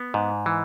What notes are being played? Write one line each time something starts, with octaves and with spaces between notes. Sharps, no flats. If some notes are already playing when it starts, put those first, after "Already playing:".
Already playing: B3
G#2
E3